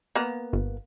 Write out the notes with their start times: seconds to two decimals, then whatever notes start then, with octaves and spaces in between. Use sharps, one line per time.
0.15 A#3 B3
0.53 G1